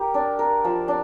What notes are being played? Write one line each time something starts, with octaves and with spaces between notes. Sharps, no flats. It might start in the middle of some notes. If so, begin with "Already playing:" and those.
Already playing: G4 A#4
D4
A#4
F3
D4